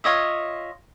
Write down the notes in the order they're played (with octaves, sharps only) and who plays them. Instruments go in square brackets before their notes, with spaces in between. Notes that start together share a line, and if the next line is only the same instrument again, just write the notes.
[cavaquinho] F4 C#5 D#5 E5